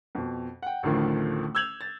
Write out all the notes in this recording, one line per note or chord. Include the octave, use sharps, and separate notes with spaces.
F2 B2
F#5 G5
A1 D2 A2 D3 D#3 F3
E6 G6 G#6 F7 F#7
A6